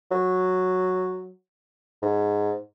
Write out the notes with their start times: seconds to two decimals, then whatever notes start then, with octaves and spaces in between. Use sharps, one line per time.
0.11 F#3
2.02 G#2